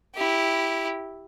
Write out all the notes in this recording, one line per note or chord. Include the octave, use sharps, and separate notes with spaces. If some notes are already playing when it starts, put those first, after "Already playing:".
E4 G4